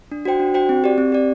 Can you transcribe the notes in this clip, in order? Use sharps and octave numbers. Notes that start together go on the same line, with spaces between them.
D4
F#4 C5 G5
D4
F#4 C5 G5
C4
G4 D5
C4
G4 D5